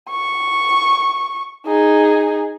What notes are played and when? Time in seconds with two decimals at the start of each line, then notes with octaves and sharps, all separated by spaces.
0.10 C#6
1.66 D#4 G#4